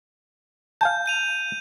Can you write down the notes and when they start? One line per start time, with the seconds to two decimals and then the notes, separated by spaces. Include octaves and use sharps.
0.81 F5 G#5 A5 G6
1.06 G6 D#7 F7